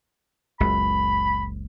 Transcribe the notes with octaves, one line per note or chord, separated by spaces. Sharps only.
F#1 C#2 B5